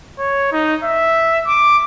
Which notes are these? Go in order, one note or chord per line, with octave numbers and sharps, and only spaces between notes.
C#5
D#4
E5
D6